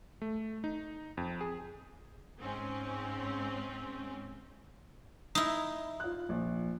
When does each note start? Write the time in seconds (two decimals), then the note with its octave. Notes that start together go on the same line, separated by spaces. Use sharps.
0.22 A3
0.64 D#4
1.17 F2
1.41 G#4
2.40 G#2 C4 C#4
5.35 D#4 E4
6.00 F4 F#6
6.29 A#1